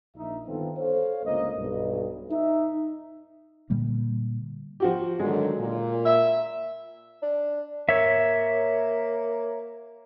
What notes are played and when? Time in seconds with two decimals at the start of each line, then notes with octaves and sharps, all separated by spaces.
0.15 A#1 D#4 E5
0.47 G1 D#3 B3 C4 F4 A4
0.77 A4 C5 C#5 F5
1.24 G1 C#2 A#3 D#5
1.57 B1 G2
2.30 D#4 E5
3.70 A#2 D3 G3 A#3
4.80 F3 F#4 G4
5.20 D2 D#3 F#3 G#3
5.59 A#2
6.05 E5
7.22 D4
7.89 A#3 C#5 E5